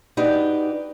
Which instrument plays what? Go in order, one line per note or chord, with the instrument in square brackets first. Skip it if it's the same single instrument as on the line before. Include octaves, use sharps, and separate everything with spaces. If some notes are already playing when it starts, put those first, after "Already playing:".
[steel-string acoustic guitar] D#4 F#4 G4 B4 D5